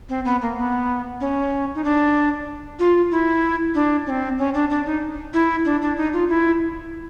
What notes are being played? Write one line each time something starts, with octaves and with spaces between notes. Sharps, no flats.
C4
B3
A#3
B3
C#4
D#4
D4
F4
E4
D4
C#4
C4
C#4
D4
D4
D#4
E4
D4
D4
D#4
F4
E4